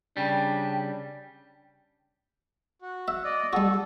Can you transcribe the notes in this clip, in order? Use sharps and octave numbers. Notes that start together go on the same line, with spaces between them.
C#3 G3 D4 G5
F#4
E5
D5 D#5
G3 F#4 A4